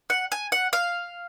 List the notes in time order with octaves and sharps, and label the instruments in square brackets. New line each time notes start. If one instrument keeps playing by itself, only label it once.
[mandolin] F#5
G#5
F#5
F5